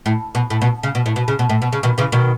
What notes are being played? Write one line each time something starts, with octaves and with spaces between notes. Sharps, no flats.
A2
B2
A2
B2
C#3
B2
A2
B2
C#3
B2
A2
B2
C#3
B2 D#3
C#3 E3
B2 D#3